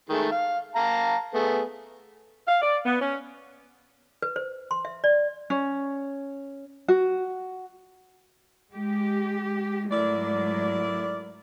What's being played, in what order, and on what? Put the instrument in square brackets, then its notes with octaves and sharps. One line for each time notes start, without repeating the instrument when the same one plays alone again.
[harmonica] D#3 G#3 A3
F5
F5 A5 A#5
A3 B3 G#4
[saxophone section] F5
D5
B3
C#4
[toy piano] B4
C5
C6
E5
D5
[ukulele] C#4
F#4
[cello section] G#3 G4
[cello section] G#2 F#3 A3 [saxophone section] E4 A#4 D5